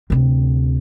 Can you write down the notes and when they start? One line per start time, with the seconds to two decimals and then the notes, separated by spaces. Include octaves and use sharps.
0.10 D2 C3